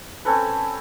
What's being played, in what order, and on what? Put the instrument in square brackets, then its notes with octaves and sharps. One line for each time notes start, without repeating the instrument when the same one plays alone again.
[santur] C4 C#4 A4 B4